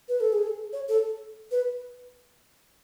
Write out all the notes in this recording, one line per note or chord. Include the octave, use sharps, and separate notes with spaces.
B4
A4
G#4
A4
C#5
A4
B4